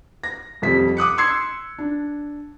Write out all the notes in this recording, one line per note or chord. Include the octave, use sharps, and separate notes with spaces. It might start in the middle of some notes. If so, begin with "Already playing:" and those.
A#6
D#1 F2 G3 B6
D6 D#6 F#6 C#7
C6 E6 G#6 C7 C#7
D4